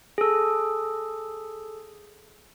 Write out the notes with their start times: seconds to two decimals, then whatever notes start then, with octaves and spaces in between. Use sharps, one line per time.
0.18 G#4 A4